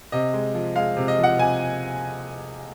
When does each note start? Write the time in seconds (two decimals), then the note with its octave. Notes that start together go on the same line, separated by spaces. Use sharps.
0.12 C3 D#5
0.34 G#3
0.54 F3
0.76 G#3 F5
0.97 C3
1.08 D#5
1.18 F3
1.23 F#5
1.39 C3 G#5